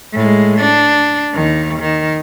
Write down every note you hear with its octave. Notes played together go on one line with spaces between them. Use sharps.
A2 G#3
D4
D#2 D#3
D#3